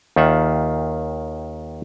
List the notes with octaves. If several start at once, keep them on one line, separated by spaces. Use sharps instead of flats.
D#2 D#3 F4 E5 F#5